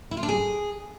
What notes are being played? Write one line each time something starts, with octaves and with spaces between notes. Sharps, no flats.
E4
F4
D4
G#4